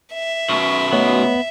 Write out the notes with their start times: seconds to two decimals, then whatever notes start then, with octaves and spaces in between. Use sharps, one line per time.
0.14 E5
0.49 F#2 B2 C#6
0.92 A3 B3 C#5 D#5